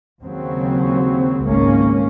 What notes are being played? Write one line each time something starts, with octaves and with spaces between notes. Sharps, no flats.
D#2 C#3 F#3 C4
G#1 C#2 G#2 G#3 A#3 C#4